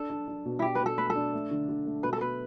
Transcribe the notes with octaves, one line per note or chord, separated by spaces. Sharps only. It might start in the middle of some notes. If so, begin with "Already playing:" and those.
Already playing: D4 A4
D4
D4
B2
E4
D4 G4
B4
B2
A4
A3 B4
A4
D4
A3
D3
D3
A3
B2 B4
A4
B2 B4